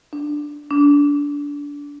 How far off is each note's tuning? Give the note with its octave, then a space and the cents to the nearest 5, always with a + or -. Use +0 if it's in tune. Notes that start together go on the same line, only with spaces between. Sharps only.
D4 +5
D4 -25